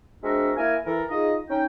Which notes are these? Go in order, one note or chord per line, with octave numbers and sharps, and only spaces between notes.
G#3 C4 D4 F#4 A#4 E5
A#3 E4 A#4 G#5
E3 A4 A#4
D#4 F4 G#4 D#5
C#4 D#4 G5